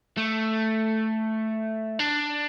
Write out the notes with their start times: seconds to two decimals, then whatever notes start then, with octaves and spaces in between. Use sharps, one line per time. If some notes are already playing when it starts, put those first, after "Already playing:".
0.17 A3
1.99 D4